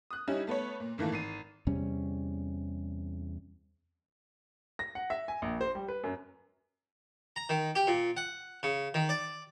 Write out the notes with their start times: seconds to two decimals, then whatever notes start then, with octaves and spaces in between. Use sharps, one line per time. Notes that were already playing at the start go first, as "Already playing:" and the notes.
0.11 D#6 F#6
0.27 G3 C#4 D#4 E4
0.47 A3 B3 B4 C#5
0.80 A#2
0.98 A2 D#3 E3 A3 A#3
1.12 G#1 C7 D#7
1.67 E2 C3 G3 C#4
4.79 A#6
4.95 F#5
5.10 E5
5.28 G#5
5.42 A#1
5.61 C5
5.75 G3
5.88 B4
6.04 F#2
7.36 A#5
7.49 D#3
7.75 G4
7.87 A#2
8.17 F#5
8.63 C#3
8.94 D#3
9.09 D5